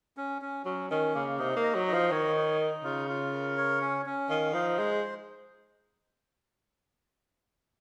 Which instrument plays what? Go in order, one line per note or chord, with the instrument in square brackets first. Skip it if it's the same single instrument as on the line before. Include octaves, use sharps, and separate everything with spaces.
[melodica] C#4
C#4
[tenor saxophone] F#3 [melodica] C#4
[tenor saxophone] D#3 [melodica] C#4
[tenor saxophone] C#3 [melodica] A#3
[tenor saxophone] C3 [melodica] D#4
[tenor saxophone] A#3
[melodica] D#5
[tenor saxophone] F#3
[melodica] D#4
[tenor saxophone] F3
[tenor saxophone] D#3 [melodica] C#5
[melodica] D#4
D#4
[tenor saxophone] C#3 [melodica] F4
[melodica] F4
A#4
C#5
C#4
C#4
[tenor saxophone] D#3 [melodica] F5
[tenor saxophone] F3 [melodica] D#4
[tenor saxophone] G#3 [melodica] C5